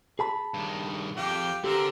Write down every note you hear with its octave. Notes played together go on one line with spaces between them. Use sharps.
G#4 A5 B5
G2 D#3
F2 G4 F5 G5
D3 C4 G4 A#4